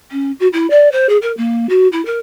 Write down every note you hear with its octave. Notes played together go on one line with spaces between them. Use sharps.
C#4
F#4
E4
D5
C5
G#4
A#4
A#3
F#4
E4
A#4